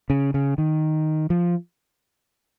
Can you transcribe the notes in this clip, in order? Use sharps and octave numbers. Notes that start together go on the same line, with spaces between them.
C#3
C#3
D#3
F3